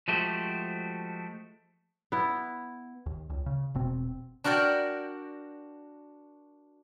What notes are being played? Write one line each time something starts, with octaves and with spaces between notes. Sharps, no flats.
F3 G#3 A3 F#4 G4 C5
B3 E4
D#2
C#2
C#3
E1 B2 C4
D4 F#4 A#4 D5 G5